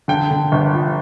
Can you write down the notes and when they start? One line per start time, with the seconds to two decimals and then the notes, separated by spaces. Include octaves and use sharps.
0.08 D3 G5
0.30 D3
0.52 G1
0.73 F3